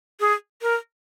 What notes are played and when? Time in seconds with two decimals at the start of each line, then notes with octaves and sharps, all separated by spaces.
0.20 G#4
0.62 A#4